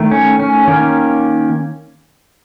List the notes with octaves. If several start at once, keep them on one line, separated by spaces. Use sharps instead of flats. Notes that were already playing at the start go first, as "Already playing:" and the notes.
Already playing: D#3 A3
C#4
C#4
D#3 A#3 C#4